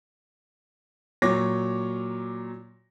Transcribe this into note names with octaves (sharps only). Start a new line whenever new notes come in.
A#2 F#3 C#5 D6 A#6